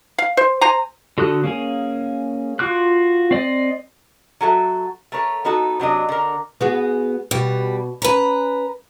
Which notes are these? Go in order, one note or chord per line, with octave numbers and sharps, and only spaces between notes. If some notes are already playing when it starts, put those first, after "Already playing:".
F5
C5
C5 G#5 A#5
D3 F#4 A4 D#6 F#6
A#3 C#4 G#4
F4 F#4 D6 F#6
C4 D5 D#5
F#3 F#4 A4 E5
A3 A#4 B4 C#5
B3 D#4 F#4 A4 B4
C3 F#3 D4 D#5
D3 A#4
B3 F#4 G#4
B2 G3
C#4 B4 A#5